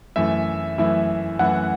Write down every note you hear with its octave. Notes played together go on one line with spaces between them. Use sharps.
F#2 E3 A3 E4 E5
F#2 E3 A3 E4
F#2 E3 A3 E4 F#5